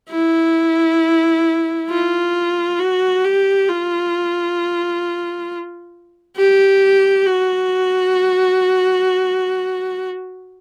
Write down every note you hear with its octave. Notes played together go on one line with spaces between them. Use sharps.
E4
F4
F#4
G4
F4
G4
F#4